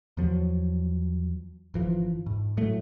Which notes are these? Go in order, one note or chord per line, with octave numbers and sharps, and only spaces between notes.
E2 F3 F#3
G1 E3 F3
G#2
A2 F#3 A3